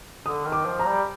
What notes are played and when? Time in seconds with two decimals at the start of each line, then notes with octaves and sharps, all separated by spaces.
0.25 D3 D#6
0.45 D#3
0.52 D6
0.66 F3
0.80 A#5
0.86 G3